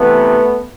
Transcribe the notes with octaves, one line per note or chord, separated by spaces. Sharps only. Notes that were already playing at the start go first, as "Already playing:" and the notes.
Already playing: C3 E3 A3 B3